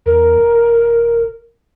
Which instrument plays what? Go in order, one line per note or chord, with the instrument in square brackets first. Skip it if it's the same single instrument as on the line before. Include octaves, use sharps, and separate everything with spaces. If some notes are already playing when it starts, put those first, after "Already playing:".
[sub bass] E2 [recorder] A#4
[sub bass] D#1